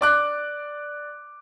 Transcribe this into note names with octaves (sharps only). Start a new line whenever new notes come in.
D5 D6 F#6